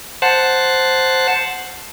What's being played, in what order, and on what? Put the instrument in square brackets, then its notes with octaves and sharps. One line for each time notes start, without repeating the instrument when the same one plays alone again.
[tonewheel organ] C5 F#5 A5